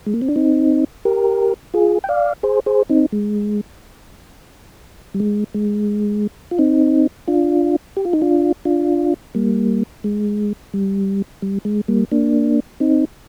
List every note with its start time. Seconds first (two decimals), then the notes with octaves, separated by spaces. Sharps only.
0.06 G#3
0.14 A#3
0.22 C4
0.28 D4
0.36 C4 D#4
1.05 G4 A#4
1.74 F4 G#4
2.04 G5
2.09 D5 F5
2.43 G#4 C5
2.66 G#4 C5
2.89 C4 D#4
3.12 G#3
5.14 G3
5.20 G#3
5.54 G#3
6.51 F4
6.59 C4 D#4
7.27 D4 F4
7.97 G4
8.05 F4
8.13 D#4
8.21 D4 F4
8.65 D4 F4
9.35 G3 A#3
10.04 G#3
10.74 G3
11.42 G3
11.65 G#3
11.88 G3 A#3
12.11 A#3 D4
12.80 C4 D#4